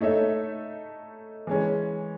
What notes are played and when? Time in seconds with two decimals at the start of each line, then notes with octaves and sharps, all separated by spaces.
0.01 A3 D#4 A4 C#5 E5
1.47 E3 G#3 C#4